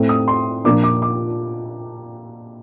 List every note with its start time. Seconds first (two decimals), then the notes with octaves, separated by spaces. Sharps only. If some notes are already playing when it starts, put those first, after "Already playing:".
Already playing: A2 A3 C4
0.09 D#6
0.28 C6
0.64 A#2 F3 A#3 D4 D6
0.84 D6
1.02 D6